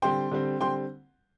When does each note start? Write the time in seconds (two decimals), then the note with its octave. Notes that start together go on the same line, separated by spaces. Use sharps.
0.02 D3 G3 C4 G5 C6
0.31 D3 G3 C4
0.60 D3 G3 C4 G5 C6